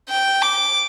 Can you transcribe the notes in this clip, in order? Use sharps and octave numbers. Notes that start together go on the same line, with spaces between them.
G5
D6